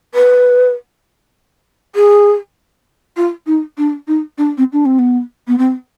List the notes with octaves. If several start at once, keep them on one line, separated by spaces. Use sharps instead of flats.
B4
G#4
F4
D#4
D4
D#4
D4
C4
D4
C4
B3
B3
C4